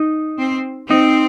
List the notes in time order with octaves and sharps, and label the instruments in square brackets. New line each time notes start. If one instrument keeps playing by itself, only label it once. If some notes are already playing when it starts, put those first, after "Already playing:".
Already playing: [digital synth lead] D#4
[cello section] C4
[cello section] C4 [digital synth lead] D#4